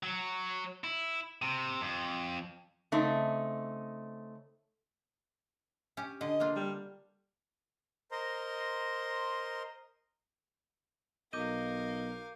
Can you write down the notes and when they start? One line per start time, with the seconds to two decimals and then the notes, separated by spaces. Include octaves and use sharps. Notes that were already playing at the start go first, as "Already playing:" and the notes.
0.03 F#3
0.84 E4
1.42 C3
1.81 F2
2.92 C#3 A3 C4 D#4
5.97 C#4 G4
6.21 D3 D#5
6.40 A#3 D4 F4
6.56 G3
8.11 A#4 C5 D#5 A#5 C6
11.33 B1 A#4 D#5 F5 D6 G6 D#7